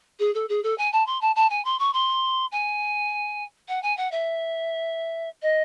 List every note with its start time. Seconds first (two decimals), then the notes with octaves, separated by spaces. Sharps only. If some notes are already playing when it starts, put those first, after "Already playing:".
0.19 G#4
0.34 A4
0.49 G#4
0.63 A4
0.78 G#5
0.92 A5
1.06 C6
1.21 A5
1.35 A5
1.50 G#5
1.65 C6
1.79 C#6
1.93 C6
2.52 G#5
3.68 F#5
3.83 G#5
3.97 F#5
4.12 E5
5.42 D#5